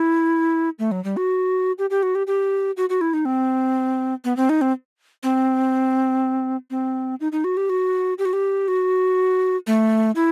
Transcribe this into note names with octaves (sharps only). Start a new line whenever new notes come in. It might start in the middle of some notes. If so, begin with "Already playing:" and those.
Already playing: E4
A3
F#3
G3
F#4
G4
G4
F#4
G4
G4
F#4
F#4
E4
D#4
C4
B3
C4
D#4
C4
C4
C4
D#4
D#4
F#4
G4
F#4
G4
F#4
G4
F#4
A3
E4